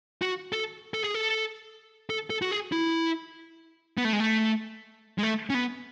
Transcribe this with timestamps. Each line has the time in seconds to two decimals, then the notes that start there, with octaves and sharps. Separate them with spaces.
0.22 F#4
0.52 A4
0.94 A4
1.04 G#4
1.14 A4
2.10 A4
2.30 A4
2.42 F#4
2.51 G#4
2.72 E4
3.97 B3
4.05 A3
4.13 G#3
4.20 A3
5.18 G#3
5.23 A3
5.50 C#4
5.54 B3